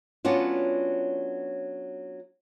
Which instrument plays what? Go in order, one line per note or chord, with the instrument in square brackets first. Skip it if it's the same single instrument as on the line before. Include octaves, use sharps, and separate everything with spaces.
[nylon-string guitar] F#3 B3 C#4 D4 F4